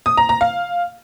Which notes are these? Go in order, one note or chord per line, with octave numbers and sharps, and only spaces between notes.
D#6
A#5
A#5
F5